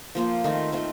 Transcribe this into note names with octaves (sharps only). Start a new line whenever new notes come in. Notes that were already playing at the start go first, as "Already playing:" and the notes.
F3 A#3 F4 C5
D#3 A3 C4 F4
D#3 A3 C4 F4